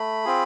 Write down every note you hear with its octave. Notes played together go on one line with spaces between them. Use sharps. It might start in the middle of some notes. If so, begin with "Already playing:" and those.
Already playing: A3 B5
C4 F4 G#4